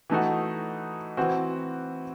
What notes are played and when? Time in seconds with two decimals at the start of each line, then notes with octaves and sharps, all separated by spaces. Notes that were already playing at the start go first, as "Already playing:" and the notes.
0.10 E3 A3 D#4 F#4
1.17 E3 C4 F#4